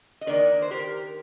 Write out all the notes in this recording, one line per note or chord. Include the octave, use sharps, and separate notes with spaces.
D#5
D#3 A#3 D4 A#4 D5
C5
G4 A#4